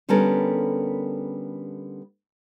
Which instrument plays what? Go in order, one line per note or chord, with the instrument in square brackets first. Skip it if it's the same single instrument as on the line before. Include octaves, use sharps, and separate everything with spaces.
[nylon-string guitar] D3 G3 B3 C#4 A4 A#4